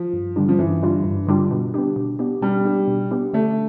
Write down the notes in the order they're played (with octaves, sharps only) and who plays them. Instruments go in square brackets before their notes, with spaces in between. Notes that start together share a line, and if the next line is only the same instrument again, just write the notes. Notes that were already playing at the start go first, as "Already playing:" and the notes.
Already playing: [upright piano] F3
[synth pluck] G2
D3 G3 D4 F4
[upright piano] F3
[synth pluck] G2 [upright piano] E3
[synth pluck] D3 G3 D4 F4
G2
D3 G3 D4 F4
B2
B3 D4 G4
B2
B3 D4 G4
[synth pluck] B2 [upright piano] G3
[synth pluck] B3 D4 G4
B2
B3 D4 G4
[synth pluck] D3 [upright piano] A3